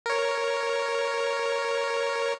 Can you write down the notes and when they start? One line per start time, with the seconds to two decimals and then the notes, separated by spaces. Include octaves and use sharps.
0.06 A#4 C#5